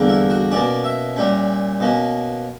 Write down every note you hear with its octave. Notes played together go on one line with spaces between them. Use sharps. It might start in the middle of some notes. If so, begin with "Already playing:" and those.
Already playing: E2 D3 G3 A#3
E4
F#4
B2 A#3 C#4 D5
E5
A#2 G3 C#4
B2 A#3 C#4